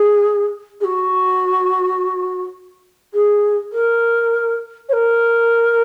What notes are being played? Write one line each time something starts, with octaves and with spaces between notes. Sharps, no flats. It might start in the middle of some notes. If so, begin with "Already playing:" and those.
Already playing: G#4
G#4
F#4
G#4
A#4
C#5
A#4